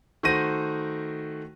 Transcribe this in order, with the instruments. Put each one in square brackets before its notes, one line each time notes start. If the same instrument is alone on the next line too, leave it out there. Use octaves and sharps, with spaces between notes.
[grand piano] D#3 A3 F#4 C5 A#6 D#7